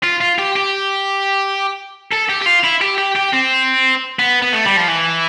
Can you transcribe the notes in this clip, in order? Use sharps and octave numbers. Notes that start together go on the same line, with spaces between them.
F4
F4
G4
G4
A4
G4
G4
F4
E4
G4
G4
G4
C4
B3
B3
A3
G3
F3
E3